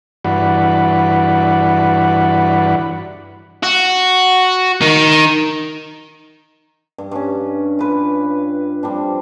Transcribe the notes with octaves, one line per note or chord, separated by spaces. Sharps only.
G2 E3 F#4 D5 F#5 B5
F#4
D#3
G2
G2 C#4
F4 B4
F3 G3 C4 D4